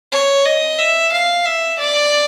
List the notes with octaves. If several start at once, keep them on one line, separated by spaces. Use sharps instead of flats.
C#5
D#5
E5
F5
E5
D5